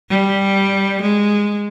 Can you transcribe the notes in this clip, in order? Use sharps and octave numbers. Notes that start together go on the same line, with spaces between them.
G3
G#3